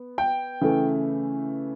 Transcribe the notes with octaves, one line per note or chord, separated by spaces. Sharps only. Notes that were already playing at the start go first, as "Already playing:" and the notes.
Already playing: B3
G5
C#3 E3 A3